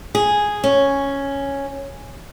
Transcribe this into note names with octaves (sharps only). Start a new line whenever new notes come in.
G#4
C#4